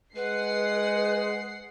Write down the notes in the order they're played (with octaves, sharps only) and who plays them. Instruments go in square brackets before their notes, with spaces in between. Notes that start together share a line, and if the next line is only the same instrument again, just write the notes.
[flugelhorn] G#3 [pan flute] B4 [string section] F#5 C7